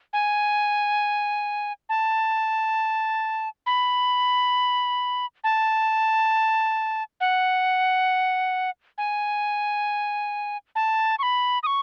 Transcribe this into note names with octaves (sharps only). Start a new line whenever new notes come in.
G#5
A5
B5
A5
F#5
G#5
A5
C#6
B5
D#6
C#6